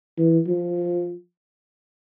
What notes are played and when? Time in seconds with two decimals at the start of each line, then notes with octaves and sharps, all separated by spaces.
0.18 E3
0.48 F3